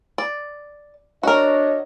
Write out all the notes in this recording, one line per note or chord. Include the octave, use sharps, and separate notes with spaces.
D5
D4 F#4 A#4 C#5 D#5